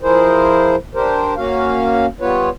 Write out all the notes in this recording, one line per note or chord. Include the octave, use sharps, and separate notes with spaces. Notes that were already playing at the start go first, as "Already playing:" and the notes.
F3 E4 G#4 A#4 C5
D4 G4 A#4 C5
A#3 C#4 F#4 F5
G3 B3 F4 B4 C#5